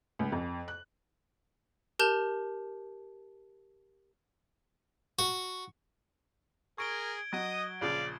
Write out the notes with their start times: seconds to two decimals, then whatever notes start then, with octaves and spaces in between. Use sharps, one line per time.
0.19 C#2
0.32 F2
0.68 F#6
1.99 G4 A#4 A5 G6 F7
5.19 F#4
6.78 G#4 A#4 C#6 G#6 D7 G7
7.33 F#3 D#5 D#6
7.81 A#1 C#3 D5 F5